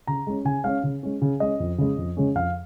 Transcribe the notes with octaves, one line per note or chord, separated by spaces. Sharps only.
C#3 A#5
G#3 C#4
C#3 G#5
G#3 C#4 F5
C#3
G#3 C#4
C#3
G#3 C#4 D#5
F2
C#3 G#3 C#4
F2
C#3 G#3 C#4
F2 F5